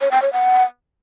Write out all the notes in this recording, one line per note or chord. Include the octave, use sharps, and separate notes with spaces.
C#5
G5
C#5
F#5